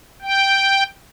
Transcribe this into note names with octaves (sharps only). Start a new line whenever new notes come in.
G5